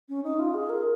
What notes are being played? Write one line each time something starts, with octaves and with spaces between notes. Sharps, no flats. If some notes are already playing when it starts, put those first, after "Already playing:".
C#4
D#4
F4
G#4
A#4